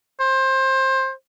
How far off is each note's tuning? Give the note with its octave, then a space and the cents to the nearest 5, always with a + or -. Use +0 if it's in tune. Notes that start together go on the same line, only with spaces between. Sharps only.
C5 +20